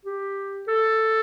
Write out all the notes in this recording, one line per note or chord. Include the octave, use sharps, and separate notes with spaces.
G4
A4